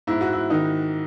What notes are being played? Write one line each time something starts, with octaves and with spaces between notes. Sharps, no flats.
G#2 E4
F#4
E4
D#3 D#4